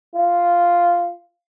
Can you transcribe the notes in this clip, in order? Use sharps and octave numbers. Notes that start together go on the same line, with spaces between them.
F4